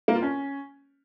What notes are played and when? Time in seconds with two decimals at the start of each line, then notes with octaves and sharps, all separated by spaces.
0.08 A#3
0.15 F4
0.22 C#4